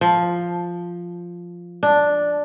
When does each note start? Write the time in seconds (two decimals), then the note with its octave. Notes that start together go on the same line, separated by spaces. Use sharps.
0.01 F3
1.83 D4